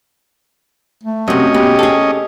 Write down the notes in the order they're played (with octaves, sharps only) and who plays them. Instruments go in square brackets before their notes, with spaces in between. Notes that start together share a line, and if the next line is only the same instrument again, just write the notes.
[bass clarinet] A3
[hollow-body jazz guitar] F#2 C3 [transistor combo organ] C#4 D#5
[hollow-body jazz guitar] B2 [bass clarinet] G4
[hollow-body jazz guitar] G#4 A4